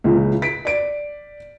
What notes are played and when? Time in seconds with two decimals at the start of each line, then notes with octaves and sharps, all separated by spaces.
0.04 C#2 A#2 C#3 E3
0.42 B6 D7
0.65 D5 D7